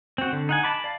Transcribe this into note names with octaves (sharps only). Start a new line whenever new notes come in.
C4 F#4
D3
D#4 F#5 G#5
A5 B5 D6
D5 F5